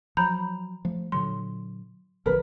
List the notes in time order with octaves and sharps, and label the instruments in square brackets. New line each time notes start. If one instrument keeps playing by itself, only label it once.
[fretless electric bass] F3 F#3 [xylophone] A#5 B5 G6
[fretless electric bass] F3 A3
[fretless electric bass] A#2 D3 F#3 [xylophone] C6
[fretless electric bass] A1 D3 F3 [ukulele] A#4 B4